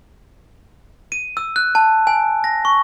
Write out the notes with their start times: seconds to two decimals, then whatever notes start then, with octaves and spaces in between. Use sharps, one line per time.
1.12 D#7
1.37 E6
1.56 F#6
1.75 A5
2.07 G#5
2.44 A#6
2.65 C#6